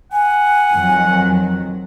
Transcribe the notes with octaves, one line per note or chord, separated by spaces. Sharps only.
F#5 G#5
F2 D#3 F#3